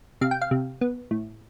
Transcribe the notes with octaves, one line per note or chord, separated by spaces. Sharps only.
C3 F5
G5
F5
C3
B3
A2